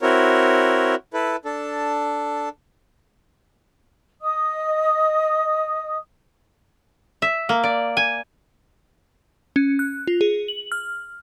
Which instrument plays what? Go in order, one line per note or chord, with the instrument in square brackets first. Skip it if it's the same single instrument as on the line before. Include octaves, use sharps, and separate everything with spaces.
[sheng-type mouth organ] C4 E4 F#4 A#4 C#5
E4 A4 B4
D4 A4
[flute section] D#5 D#6
[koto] E5
A#3
D5
G#5
[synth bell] C#4
F#6
F4
G#4
F#7
F6